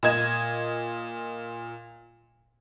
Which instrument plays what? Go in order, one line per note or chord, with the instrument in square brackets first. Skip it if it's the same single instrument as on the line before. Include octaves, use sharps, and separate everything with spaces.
[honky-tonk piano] A#2 D#5 G#6 E7